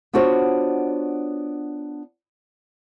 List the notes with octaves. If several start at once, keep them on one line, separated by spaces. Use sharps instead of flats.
B3 D4 F4 F#4 C5 C#5